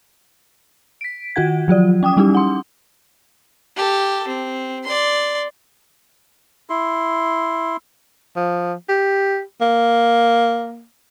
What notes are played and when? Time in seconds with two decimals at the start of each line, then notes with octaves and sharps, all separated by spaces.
1.01 B6 D7
1.36 D#3 F4 F#4 F#5 G#6
1.68 F3 F#3 F4 D5
2.03 C#4 G5 D6 D#6
2.17 G3 C#4 D#4 E4 G4
2.35 F#5 C6
3.77 G4 A4
4.28 C4
4.84 D5 C6
6.70 E4 C6
8.36 F3
8.89 G4
9.61 A#3